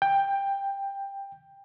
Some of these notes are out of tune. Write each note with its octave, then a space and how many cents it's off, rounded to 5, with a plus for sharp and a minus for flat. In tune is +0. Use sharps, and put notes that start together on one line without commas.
G5 +15